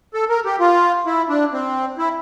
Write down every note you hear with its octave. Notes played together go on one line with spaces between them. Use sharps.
A4
A#4
G4
F4
E4
D4
C4
E4